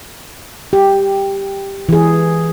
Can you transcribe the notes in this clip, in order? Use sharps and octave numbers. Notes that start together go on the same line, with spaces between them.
G4
E3 G#4